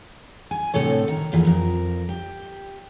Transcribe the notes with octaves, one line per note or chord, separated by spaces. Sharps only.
G#5
D2 A2 C3 A4 C#5
D#3
E2 A#2 E3 F3
F2 A#4
G4